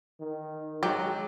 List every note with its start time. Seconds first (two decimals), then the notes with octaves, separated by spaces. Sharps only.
0.20 D#3
0.83 F#3 G#3 G4